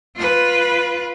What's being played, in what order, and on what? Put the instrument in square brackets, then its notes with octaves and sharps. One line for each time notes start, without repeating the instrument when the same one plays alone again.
[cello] F4 B4